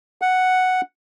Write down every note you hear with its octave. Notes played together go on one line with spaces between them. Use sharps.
F#5